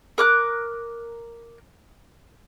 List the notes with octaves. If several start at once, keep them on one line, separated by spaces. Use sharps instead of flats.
A#4 D6 F#6